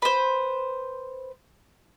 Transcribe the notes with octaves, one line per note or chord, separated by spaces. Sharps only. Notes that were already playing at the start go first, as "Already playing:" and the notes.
B4 C5